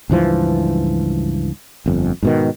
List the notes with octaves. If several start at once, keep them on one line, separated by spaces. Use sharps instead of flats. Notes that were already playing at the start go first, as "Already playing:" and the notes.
C#2 G2 E3 F3
G1 F2
G#2 B2 D#3